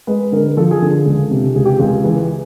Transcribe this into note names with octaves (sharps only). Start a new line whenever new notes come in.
G#3 B4
D3 A#4
F3 A4
G#4
D3 A4
C#2
C3
C#2 G#4
G4
C#2 G#4
E3